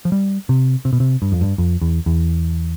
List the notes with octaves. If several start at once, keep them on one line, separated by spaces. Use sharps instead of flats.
F3
G3
C3
C3
B2
C3
G2
F2
G2
F2
E2
E2